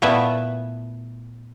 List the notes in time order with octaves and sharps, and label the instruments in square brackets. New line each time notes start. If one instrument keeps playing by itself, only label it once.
[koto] A#2 A3 B3 E4 E5